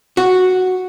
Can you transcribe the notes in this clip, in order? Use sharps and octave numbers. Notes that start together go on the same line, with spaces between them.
F#4